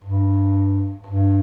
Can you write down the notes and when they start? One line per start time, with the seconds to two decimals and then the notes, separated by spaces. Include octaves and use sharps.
0.04 G2
1.06 G2